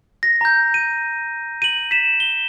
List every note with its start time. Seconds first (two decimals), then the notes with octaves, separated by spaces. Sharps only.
0.23 A#6
0.41 A#5 G6
0.74 D#7
1.62 D#7 F#7
1.91 B6 E7
2.20 G7